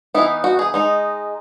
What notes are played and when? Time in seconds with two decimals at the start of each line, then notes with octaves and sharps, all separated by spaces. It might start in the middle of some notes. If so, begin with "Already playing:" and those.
0.14 E3 B3 D#4 E4
0.44 F#4
0.59 G#4
0.74 G#3 D#4